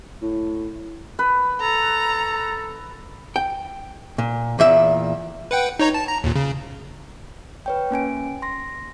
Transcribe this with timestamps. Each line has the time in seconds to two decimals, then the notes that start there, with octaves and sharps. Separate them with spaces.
0.22 A2
1.19 B4
1.61 A4 A#5
3.36 G5
4.18 A#2
4.59 E2 A#2 E5
5.51 B4 F#5 G5
5.80 D#4 C#5 A#5
5.94 A5
6.08 A#5
6.24 D#2 A#2
6.36 C#3
7.66 B4 C#5 G5
7.91 A#3 C#4 G#5 D7
8.42 C6 A#6